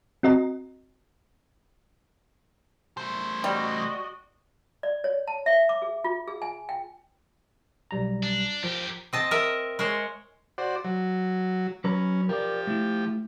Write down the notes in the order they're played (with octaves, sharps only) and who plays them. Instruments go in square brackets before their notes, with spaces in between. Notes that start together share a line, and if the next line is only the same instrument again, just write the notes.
[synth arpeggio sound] C4 F#4 D#5 A#5
[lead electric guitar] A3 C5
[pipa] G3 [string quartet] F#4 D5 D#5
[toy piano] D5
C#5
A5
E5
D6
G#4
F4
G#4
G#5
G5
[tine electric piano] B1 G3 A#5
[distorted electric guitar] D4
[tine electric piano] F3 [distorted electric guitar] G4 A#4
[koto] C4 D#5 A5
A#4 D#5 E5
G#3 A#4 C5 C#5
[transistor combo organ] F#4 C5 D5
F#3
[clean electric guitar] F#3 B4 A#5 [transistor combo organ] C#4
[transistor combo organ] F3 G4 [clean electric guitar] A#4 D5
[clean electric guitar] A3 E4